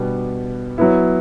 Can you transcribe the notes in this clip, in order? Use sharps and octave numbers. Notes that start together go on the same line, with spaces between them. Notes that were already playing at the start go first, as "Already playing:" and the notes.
Already playing: B2 G3 B3 D4
F#3 B3 E4